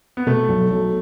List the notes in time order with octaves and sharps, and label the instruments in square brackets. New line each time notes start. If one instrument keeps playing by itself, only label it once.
[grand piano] B3
[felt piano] B2 [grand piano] A3
[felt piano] B1
F#3